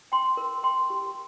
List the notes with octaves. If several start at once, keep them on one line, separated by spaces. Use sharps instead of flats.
G5 C6
A#4
G5 C6
G4